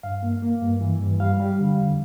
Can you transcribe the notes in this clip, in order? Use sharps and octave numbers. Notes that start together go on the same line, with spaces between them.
G2 F5
A#3
A#3
G2
E3
G2
G3 F5
G3
D3
F2